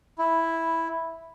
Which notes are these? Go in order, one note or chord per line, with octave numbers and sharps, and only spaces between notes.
E4